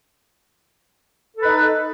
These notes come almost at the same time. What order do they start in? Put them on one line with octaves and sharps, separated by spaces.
A4 B4 D#4